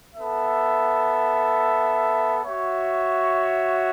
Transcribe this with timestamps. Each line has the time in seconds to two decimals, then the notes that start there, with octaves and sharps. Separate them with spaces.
0.15 B3 A4 E5
2.43 F#4 C#5 E5